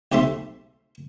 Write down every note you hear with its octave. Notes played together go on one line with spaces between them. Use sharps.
B1 C3 A3 A4 E5 C6